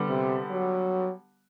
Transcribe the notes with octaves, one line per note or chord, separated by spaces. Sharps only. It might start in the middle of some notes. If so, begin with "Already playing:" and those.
Already playing: D3 G3 B3
C3
F#3